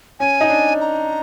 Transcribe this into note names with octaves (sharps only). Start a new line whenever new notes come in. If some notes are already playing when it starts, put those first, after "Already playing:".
C#4 G#5
D#4
D4
A#5